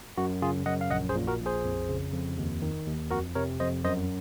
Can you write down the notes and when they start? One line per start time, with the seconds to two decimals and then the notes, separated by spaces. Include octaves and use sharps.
0.17 F#2 F#4
0.42 C#3 F4 G#4
0.66 F#2 D#5 F#5
0.81 F5
0.90 A#1 D#5 F#5
1.09 G#4 C5
1.15 A#2
1.27 F#4 A#4
1.40 A#1
1.46 G#4 C5
1.65 F2
1.89 C#3
2.13 F2
2.38 D#2
2.62 D#3
2.86 D#2
3.10 F2 F#4 A#4
3.35 C3 A#4 C#5
3.60 F2 C5 D#5
3.85 F#2 C5 D#5